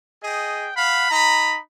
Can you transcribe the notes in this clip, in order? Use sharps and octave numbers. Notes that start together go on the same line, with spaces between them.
G#4 D#5 G5
F5 F#5 B5
D#4 A#5 B5